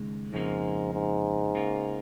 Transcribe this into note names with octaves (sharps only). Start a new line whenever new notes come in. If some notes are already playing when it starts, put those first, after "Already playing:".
Already playing: D#2 C#3 G#3 D#4
F2 G#2 C#3 F3 A#3
G#2
C#3 A#3 F4